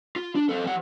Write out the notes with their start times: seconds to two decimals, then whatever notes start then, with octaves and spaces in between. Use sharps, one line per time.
0.16 F4
0.35 D4
0.49 C4 A4
0.64 F3 F#5